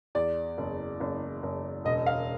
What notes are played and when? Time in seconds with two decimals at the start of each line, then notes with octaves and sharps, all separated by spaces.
0.15 E2 D5
0.58 F#1
1.00 F#1
1.43 F#1
1.84 E1 D#5
2.06 F5